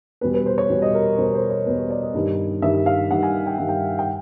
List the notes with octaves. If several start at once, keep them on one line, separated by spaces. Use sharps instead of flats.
E2 B2 G3 B4
B4
C5
C#5
E2 B2 G3
D#5
A#4
E2 B2 G3 C5
C5
C#5
E2 B2 G3 B4
C#5
D5
D#5
G2 D#3 G3
G2 D#3 G3 E5
F5
G2 D#3 G3 F#5
G#5
G5
G2 D#3 G3 G#5
G5
G5